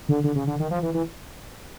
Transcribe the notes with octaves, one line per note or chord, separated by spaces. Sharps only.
D3
D3
C#3
D3
D#3
F3
E3
E3